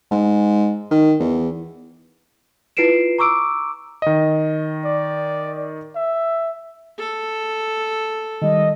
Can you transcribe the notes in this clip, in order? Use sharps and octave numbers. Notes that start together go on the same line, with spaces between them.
G#2
D#3
E2
E4 F4 B4 C7 D7 E7
A#5 C#6 D6 E6 D7
D#3 D#5
D5
E5
A4
D#3 G3 D#5